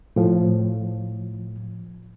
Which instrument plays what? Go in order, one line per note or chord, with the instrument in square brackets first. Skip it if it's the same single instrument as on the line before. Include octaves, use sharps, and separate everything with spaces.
[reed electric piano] A2 F3